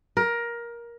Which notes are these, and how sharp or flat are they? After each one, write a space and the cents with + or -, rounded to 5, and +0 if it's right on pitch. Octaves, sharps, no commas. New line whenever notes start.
A#4 +15